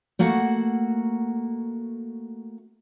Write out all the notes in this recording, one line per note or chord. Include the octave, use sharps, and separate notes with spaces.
A3 A#3 F#4 F#5